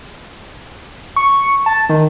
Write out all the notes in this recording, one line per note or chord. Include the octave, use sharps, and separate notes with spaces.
C#6
A5
D#3